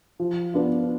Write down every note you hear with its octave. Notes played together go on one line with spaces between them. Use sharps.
F3
B3 D4 F4